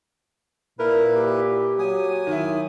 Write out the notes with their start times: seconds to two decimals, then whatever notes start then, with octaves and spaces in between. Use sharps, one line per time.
0.79 A#2 E4 A#4 B4
1.15 G4
1.79 F#3 G#5 D#6
2.27 D#3 E4